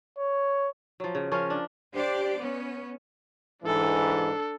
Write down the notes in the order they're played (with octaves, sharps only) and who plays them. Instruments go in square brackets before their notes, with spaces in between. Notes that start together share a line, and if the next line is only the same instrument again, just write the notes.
[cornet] C#5
[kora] F3 F#3
C#3
F3 C#4 A#4 C#5
D4
[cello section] D4 G4 C5 D5
B3 C#4
[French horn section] G#2 E3 [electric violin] D4 A4